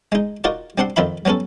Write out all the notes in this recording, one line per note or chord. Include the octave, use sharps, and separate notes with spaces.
G#3 D#4
D#4 F4 F#4 A#4 D5
G3 C4 D4 F#5 C6
F2 D#3 F4 E5 B5
F#3 G3 B3 C#4 A4